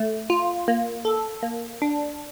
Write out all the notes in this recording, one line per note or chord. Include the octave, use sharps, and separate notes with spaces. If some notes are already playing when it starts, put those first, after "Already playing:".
Already playing: A3
F4
A#3
A4
A#3
D4